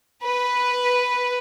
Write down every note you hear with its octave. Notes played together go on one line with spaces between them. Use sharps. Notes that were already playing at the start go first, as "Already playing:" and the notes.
B4